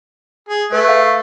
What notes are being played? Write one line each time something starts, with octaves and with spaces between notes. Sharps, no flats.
G#4
A3 B4
F5